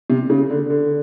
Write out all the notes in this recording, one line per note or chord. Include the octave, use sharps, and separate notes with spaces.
C3
C#3
D3
D3